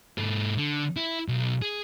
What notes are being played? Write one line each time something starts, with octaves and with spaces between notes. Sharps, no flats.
G#2 A4
D3
E4
B1
G#4